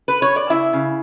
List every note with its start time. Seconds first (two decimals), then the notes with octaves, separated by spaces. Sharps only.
0.08 B4
0.22 C#5
0.36 D5
0.50 C#3 E4 E5
0.73 C#3